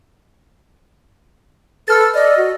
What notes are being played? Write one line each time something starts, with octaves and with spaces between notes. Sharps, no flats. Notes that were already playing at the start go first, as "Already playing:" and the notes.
A4 B4 E6 F6 A6
D5 D#5
F#4